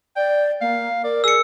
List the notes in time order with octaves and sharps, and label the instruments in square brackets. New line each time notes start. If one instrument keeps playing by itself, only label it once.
[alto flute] D5 [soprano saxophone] G5
[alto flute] A#3 [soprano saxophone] F5
[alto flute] A#4 [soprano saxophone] D5
[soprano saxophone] G#4 [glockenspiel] E6 C#7